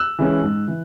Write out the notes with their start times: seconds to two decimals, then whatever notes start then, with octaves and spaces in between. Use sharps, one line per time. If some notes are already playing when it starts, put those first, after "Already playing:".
Already playing: E6 F#6
0.19 E3 G#3 C#4
0.43 G#2
0.68 E3